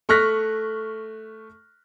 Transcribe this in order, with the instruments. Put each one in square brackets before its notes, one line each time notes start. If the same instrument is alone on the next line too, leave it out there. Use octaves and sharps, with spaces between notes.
[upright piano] A3 C#6 F6 F#6 A#6 B6